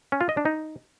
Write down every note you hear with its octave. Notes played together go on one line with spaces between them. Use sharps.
C#4
F4
D#5
D4
D#4